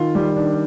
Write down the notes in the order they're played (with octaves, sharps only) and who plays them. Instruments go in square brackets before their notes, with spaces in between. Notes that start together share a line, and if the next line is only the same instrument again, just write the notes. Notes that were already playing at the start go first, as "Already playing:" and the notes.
Already playing: [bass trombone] D#3 [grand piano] F4
[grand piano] G3
D4